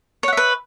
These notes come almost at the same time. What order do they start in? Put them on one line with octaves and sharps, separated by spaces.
C#5 F#5 E5 B4